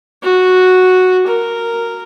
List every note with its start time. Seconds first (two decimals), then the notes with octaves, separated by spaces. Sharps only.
0.23 F#4
1.27 A#4